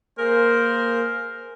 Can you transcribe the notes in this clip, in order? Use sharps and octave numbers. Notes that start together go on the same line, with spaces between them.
A#3 G#4 A#4 C5